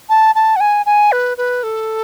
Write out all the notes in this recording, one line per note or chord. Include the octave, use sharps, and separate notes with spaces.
A5
A5
F#5
G#5
G#5
B4
B4
A4